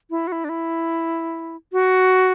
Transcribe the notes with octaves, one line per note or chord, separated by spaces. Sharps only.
E4
F#4
E4
D4
E4
F#4